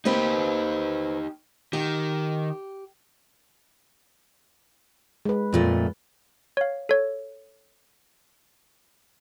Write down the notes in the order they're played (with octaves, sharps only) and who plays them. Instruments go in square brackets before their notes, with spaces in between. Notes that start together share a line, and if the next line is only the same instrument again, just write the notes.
[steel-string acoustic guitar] A#3 C4 B4 [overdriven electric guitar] D#4 G4
[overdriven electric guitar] D#3 [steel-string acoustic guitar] G4
[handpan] G#3 B4
[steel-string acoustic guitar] F2 A#2 A3
[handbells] C#5 F5
A4 C#5